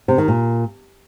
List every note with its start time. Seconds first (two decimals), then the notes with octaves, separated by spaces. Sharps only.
0.08 C3
0.18 D#3
0.28 A#2